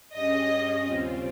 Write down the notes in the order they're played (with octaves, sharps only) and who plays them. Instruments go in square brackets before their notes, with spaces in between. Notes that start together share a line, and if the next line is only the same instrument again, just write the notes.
[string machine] G2 G3 C#4 G#4 [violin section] D#5
[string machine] D#2 C#3 G3 C4 F4